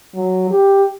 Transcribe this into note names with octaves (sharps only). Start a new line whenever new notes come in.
F#3
G4